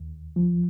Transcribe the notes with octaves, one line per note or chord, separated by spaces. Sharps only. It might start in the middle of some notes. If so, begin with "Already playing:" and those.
Already playing: D#2
F3